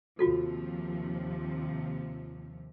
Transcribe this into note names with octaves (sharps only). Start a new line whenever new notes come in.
D#2 C3 F3 F4 F#4 A4